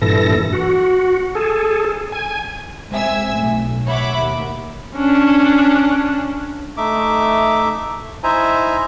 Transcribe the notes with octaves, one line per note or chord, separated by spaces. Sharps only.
G2 A#2 E3 A4 A#6
F#4
G#4 A4
G#5
G#3 C4 E5 G#5 E6
B1 A2
C#5 E5 F#5 B5 D6
D#2
C#4 D4
A3 D#4 E5 D6
D#4 E4 C5 E5 G#5 A#5